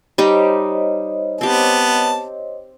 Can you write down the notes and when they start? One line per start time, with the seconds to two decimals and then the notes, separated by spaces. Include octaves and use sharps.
0.18 G3 D#4 G4 C5 C#5 D#5
1.41 B3 C4 G4 A5